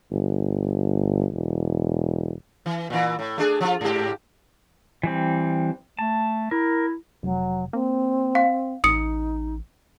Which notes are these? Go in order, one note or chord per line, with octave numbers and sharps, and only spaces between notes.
G1
E1
E3
A#2 E3
A2
A3 D4 G#4
F3 F4
G#2 G4
E3 G3 C4
A3 A5
E4 A#4
F1 F#3
A#3 C4
F5
A1 D#4 D#6 C#7